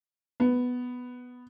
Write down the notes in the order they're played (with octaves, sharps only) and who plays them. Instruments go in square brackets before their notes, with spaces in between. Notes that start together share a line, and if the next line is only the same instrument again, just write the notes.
[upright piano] B3